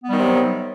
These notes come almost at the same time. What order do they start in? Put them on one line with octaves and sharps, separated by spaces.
B3 G3 D#3 C3 F#3